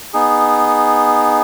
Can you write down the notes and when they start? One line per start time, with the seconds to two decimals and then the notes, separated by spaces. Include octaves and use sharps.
0.13 B3 D#4 G#4